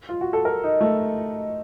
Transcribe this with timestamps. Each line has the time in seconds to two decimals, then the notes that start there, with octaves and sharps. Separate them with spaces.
0.09 F4
0.21 F#4
0.33 A4
0.45 A#4
0.64 D#4
0.81 A3